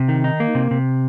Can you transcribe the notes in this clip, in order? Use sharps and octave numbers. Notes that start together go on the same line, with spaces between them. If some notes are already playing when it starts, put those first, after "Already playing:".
Already playing: C3
D#3
D#4
A#3
C3
C3